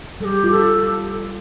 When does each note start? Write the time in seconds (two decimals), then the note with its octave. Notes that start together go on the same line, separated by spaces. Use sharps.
0.20 G3 A4
0.25 G4
0.44 F4
0.51 A4